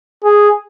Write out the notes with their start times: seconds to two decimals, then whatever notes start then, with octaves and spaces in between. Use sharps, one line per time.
0.25 G#4